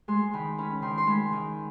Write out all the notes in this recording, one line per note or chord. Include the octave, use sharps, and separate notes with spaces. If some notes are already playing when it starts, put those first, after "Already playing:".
G#3 C6
D#3 B5
C#4 B5
D#3 C6
C6
G#3 B5
D#3